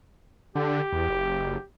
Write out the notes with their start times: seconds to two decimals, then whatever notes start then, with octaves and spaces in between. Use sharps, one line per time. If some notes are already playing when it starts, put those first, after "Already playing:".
0.55 D3 G4
0.93 E2
1.09 F#1